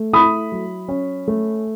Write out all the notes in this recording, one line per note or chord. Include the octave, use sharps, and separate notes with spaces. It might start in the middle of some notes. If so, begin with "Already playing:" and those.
Already playing: A3
E4 B5 D#6
F#3
C#4
A3